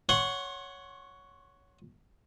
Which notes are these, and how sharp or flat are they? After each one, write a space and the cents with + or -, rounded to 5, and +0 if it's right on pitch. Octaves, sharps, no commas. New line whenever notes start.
C#5 +10 F#5 +0 C6 +40